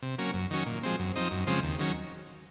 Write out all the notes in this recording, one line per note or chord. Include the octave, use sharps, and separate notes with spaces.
C3
F#3 A#3 C#4
F#2
D#3 F#3 C#4
A#2
F3 G#3 C4
F#2
F3 C4 D#4
F#2
C#3 F3 G#3 C4
D#2
D#3 F#3 C#4